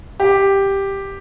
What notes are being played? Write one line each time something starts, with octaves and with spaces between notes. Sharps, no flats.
G4